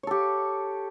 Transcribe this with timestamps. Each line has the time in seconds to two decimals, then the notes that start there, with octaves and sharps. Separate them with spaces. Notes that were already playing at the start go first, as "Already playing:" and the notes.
0.03 C#5
0.07 A4
0.11 G4